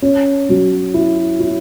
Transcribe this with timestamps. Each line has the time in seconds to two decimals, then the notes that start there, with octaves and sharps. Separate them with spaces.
0.02 C#4
0.49 F#3
0.94 E4
1.40 E4